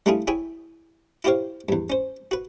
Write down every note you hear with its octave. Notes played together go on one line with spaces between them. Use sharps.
G3 A3 D4 E4 F4 G#4
E4 G#4 C#5 E5 G5 G#5
E4 F4 G4 C5 C#5 F5
E2 G2
C#4 C5
F#4 B4